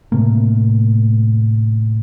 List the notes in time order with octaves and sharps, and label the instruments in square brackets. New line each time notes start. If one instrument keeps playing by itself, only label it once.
[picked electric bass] A2 C3 A3 A#3